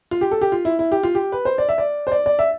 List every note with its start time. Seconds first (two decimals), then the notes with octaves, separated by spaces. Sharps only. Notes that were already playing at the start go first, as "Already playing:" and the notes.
0.11 F4
0.21 G4
0.31 A4
0.41 G4
0.52 F4
0.65 E4
0.79 E4
0.92 G4
1.03 F4
1.15 G4
1.32 B4
1.45 C5
1.58 D5
1.69 E5
1.78 D5
2.07 C5
2.12 D5
2.26 D5
2.39 E5